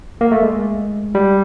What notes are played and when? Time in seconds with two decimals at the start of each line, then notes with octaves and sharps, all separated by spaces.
0.21 A#3
0.32 A3
0.43 G#3
1.15 G3